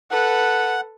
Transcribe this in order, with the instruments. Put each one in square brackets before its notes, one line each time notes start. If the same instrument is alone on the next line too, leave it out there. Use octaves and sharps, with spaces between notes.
[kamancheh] A4 B4 [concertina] F#5